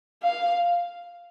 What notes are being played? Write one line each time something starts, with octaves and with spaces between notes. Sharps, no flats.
F5